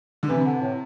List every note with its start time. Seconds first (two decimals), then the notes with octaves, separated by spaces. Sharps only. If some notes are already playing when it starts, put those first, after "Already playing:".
0.23 D3
0.29 C3 E3
0.46 D3
0.61 A2